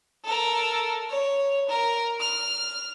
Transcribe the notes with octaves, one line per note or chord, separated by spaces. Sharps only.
A4 A#4
C#5
A#4
F6